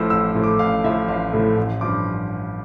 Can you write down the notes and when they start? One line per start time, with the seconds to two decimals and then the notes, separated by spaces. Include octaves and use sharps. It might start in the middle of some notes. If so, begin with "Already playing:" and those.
Already playing: A1 A2 F3 A3 E6
0.10 A1 E6
0.35 A2 F3 A3
0.44 D6
0.59 A1 F5
0.84 A2 F3 A3 E5
1.08 A1 F5
1.33 A2 F3 A3
1.57 A1
1.81 G2 F3 D6